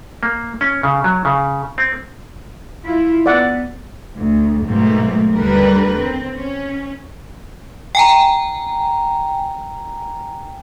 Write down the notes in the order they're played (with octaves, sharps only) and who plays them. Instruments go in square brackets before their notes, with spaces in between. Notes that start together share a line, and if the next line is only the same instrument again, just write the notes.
[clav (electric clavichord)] A#3
C#4
C#3
F#3
C#3
C4
[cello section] E4 F4
[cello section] B3 [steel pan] D5 F#5
[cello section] D2
G#2 B2 F#3 A3 A#3 C4
D#2 D3 G3 A#4 B4
C4
C#4
[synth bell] G5 G#5 A#5